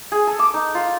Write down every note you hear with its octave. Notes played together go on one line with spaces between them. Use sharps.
G#4
A4
D6
D#4
F4